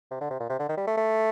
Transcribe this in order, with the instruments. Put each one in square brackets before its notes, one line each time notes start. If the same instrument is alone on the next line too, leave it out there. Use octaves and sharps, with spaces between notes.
[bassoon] C3
D3
C3
A#2
C3
D3
D#3
G3
A3
A3